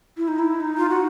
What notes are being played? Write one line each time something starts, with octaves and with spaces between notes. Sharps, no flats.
E4
D#4
E4
D#4
F4
F#4